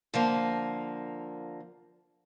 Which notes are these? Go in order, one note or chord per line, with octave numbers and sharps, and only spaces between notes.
D3 F3 A#3